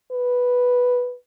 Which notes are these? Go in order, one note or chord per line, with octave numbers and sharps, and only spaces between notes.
B4